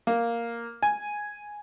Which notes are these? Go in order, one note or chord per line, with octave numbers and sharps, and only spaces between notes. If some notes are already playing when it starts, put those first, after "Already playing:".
A#3
G#5